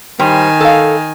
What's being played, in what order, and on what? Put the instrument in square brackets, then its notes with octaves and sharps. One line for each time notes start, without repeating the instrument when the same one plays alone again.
[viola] D#3 G#5 [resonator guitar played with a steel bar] G3 C5
[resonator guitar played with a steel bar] A4 F5